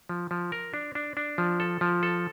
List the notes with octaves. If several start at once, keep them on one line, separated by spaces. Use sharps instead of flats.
F3
F3
A#4
D4
D4
D4
F3
A4
F3
A4